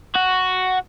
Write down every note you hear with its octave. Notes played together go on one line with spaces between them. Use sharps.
F#4